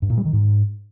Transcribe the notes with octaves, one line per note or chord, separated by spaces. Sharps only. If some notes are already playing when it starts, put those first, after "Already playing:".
G2
A#2
G3
D#3
G#2